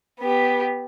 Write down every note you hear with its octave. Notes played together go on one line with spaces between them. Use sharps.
B3 G4